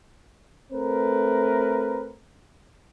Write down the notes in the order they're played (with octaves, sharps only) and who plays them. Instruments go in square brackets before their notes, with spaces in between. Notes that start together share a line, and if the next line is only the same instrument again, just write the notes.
[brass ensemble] A3 C4 A#4 B4